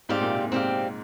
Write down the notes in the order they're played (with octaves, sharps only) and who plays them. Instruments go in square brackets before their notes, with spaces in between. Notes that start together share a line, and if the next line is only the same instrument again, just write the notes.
[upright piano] G#2 [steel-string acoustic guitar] C4 G4 D5 F5
[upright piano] A#2
C3
A#2
[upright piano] G#2 [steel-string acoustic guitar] C4 G4 D5 F5